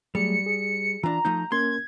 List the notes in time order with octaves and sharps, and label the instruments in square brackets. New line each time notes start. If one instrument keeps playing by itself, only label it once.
[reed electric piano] F#3 A3 G#4 [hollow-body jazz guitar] G3 [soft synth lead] C#7
[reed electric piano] G#4
[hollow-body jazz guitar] E3 D4 [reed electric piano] F4 [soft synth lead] A#5
[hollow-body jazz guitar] F3 A3 D#4 [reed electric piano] G6
[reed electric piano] A#3 C#4 A#4 [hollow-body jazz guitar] C6 [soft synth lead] G#6